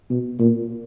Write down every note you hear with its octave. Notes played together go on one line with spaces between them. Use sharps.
B2
A#2